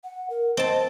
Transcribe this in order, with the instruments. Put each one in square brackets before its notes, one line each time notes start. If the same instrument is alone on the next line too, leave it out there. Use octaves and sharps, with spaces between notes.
[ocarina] F#5
A#4
[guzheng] C4 A5 [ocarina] D#5